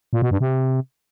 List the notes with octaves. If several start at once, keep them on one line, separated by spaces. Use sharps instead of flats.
A#2
B2
G2
C3